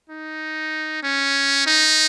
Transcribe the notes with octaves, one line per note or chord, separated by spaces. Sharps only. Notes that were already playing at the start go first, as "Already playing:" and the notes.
D#4
C#4
D#4